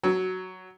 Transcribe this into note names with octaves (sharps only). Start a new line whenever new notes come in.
F#3